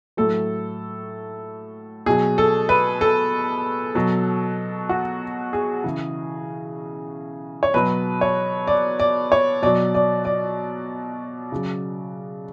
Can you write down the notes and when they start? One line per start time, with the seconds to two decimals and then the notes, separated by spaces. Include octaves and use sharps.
0.17 A2 F#3 A4
2.06 B2 F#3 G#4
2.38 A4
2.69 B4
3.01 A4
3.95 B2 F#3
4.89 F#4
5.53 G#4
5.84 C#3 E3
7.63 C#5
7.74 B2 F#3 B4
8.21 C#5
8.67 D5
9.00 D5
9.32 C#5
9.62 B2 F#3 D5
9.95 D5
10.25 D5
11.52 C#3 F#3